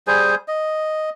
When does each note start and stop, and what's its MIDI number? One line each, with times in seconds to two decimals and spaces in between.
0.07 0.35 55
0.07 0.35 68
0.07 0.35 72
0.07 0.35 80
0.48 1.10 75